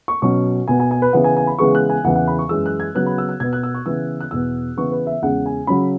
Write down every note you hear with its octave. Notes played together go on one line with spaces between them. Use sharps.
C#6
B2 F#3 C#4 C#6
B2 B3 G#5
G#5
G#5
B4
C#3 E3 B3 F#5
G#5
G#5
B5
C#3 E3 G#3 B3 C#6
F#6
G#5
E2 C#3 E3 F#5
F#5
B5
C#6
F#2 E3 G#3 E6
F#6
G#6
C#3 F#3 B3 F#6
B5
E6
F#6
B2 B3 G#6
F#6
E6
C#6
C#3 E3 B3 E6
F#6
E2 B2 B3 E6
C#3 E3 B3 C#6
B4
E5
E2 C#3 G#3 C#4 F#5
G#5
C#3 F#3 C#4 B5